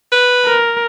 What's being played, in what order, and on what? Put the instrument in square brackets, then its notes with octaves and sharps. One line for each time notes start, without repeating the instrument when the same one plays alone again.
[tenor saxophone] B4
[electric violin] A#4